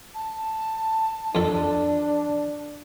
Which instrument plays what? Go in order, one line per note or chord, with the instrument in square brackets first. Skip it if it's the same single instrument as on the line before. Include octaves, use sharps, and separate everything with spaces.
[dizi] A5
[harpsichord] F2 A4 [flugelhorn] D4